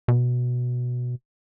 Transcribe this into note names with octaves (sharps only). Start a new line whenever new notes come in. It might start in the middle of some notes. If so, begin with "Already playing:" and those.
B2